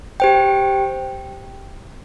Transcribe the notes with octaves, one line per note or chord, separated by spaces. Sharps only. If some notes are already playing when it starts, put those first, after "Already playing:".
G4 C5 G5